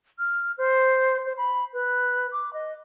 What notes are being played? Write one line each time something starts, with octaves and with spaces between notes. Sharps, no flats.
F6
C5
C5
B5
B4
D6
D#5